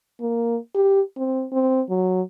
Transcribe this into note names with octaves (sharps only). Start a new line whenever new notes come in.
A#3
G4
C4
C4
F#3